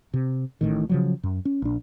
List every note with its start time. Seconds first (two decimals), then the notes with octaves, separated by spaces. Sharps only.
0.14 C3
0.61 A1 A2 D#3
0.89 C#3 F3 F#3
1.23 F#2
1.45 C#4
1.62 A#1 D4